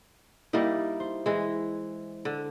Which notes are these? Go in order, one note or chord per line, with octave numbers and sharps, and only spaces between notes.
G3 A#3 D#4 E4
C5
E3 G#3
D3